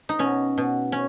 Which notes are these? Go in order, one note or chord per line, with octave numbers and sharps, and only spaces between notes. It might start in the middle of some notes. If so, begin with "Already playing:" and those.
D#4
B2 C#4
B2
C#4